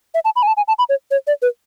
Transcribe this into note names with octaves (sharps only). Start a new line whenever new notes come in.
E5
A5
B5
G#5
A5
G#5
A5
B5
C#5
C#5
D5
B4